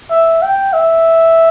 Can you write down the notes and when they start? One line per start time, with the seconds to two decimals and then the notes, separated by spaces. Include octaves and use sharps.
0.11 E5
0.42 G5
0.73 E5